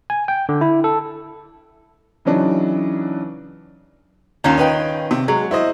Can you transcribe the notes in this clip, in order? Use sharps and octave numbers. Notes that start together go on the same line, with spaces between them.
G#5
G5
D3
E4
A4
C#3 E3 F#3 D4 D#4
D#2 D#3 C#4 F4
D#4 B4 G5
C3
F#3 G#3
E4 C5 D#5